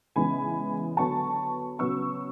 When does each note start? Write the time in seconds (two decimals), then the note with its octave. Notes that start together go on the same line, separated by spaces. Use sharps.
0.16 C#3 E3 G#3 B3 G#5 B5
0.97 D3 F#3 B3 A5 C#6
1.79 C#3 F#3 B3 C#6 E6